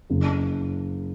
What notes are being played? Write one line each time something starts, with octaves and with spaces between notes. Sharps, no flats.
F#1